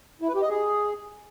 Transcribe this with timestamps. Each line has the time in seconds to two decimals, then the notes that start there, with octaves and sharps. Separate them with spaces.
0.21 E4
0.28 B4
0.35 G4
0.42 D#5
0.49 G#4